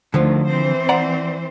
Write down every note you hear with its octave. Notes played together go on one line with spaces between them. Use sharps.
D2 D3 D#3 F3 F4
E3 C4 C5
D5 F#5 A#5